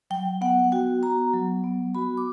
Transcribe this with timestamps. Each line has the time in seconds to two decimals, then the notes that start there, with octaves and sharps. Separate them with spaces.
0.10 F#3 G5
0.41 B3 F#5
0.72 F#4 G5
1.02 B3 A#5
1.33 F#3
1.64 B3
1.95 F#4 B5
2.17 D6